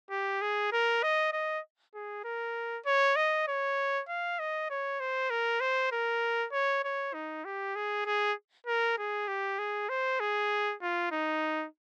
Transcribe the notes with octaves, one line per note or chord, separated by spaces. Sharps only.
G4
G#4
A#4
D#5
D#5
G#4
A#4
C#5
D#5
C#5
F5
D#5
C#5
C5
A#4
C5
A#4
C#5
C#5
D#4
G4
G#4
G#4
A#4
G#4
G4
G#4
C5
G#4
F4
D#4